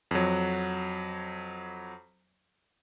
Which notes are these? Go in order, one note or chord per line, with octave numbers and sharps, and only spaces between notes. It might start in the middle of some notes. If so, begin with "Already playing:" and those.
F2 F#3